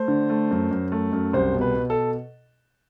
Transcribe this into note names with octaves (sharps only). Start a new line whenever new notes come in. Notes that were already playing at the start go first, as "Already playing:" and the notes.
Already playing: A3 C5
D3
A3
F#2
F#2
A3
F#2
C2 C5
B2
B4
B2
A4